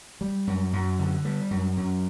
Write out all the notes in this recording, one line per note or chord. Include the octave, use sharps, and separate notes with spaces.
G3
F#2
F#2
D3
G3
F#2
F#2